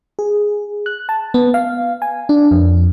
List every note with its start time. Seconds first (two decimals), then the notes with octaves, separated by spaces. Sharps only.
0.19 G#4
0.86 F#6
1.09 A5
1.34 B3
1.54 F5
2.02 G#5
2.29 D4
2.51 F2